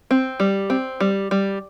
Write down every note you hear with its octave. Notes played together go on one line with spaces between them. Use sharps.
C4
G3
C4
G3
G3